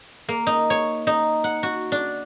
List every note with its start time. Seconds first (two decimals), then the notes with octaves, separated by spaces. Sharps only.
0.29 A#3
0.47 D#4
0.70 C#5
1.07 D#4
1.44 F#5
1.63 F#4
1.92 D4